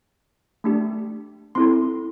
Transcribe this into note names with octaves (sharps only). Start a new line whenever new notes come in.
A3 D4 G4
C4 E4 A4 C6